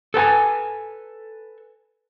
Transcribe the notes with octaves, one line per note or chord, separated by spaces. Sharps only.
A4 B4 G5 G#5